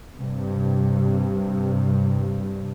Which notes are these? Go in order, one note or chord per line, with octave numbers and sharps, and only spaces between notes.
G2 C3